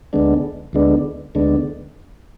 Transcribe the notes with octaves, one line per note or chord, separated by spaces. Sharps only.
D2 D3 G#3 B3 D4
D2 D3 G#3 B3 D4
D2 D3 G#3 B3 D4